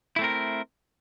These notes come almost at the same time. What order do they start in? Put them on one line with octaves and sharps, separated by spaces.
E4 A3 C4 A#4